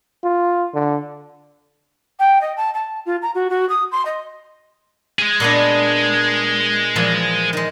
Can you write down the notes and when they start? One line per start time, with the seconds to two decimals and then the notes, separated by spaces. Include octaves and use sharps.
0.24 F4
0.74 D3
2.19 G5
2.41 D#5
2.57 A5
2.74 A5
3.06 F4
3.22 A#5
3.35 F#4
3.50 F#4
3.69 D#6
3.92 C6
4.05 D#5
5.19 G#3 G#4
5.40 A#2 B3 D4
6.96 A#2 E3 F3
7.53 D#3 G#3